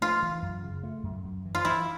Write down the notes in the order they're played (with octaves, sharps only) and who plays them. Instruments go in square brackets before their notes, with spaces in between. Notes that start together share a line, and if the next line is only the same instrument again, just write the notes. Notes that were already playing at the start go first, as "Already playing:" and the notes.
[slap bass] A3 [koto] F4
[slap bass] E3
F#2
C#3
A3
F#2
F#2
E3
[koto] F4
[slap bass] E3 [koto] E4